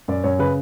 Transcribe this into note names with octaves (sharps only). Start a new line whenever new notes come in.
F#2 D5
F#2 C#5
C#3 B4